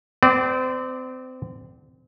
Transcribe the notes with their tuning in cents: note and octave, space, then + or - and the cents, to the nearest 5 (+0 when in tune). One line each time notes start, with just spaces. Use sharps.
C4 -30 D5 +5